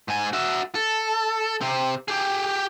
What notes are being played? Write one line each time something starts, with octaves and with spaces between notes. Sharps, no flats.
G#2 G#5
F#4 E5
A4
C3 C4
G4 G#4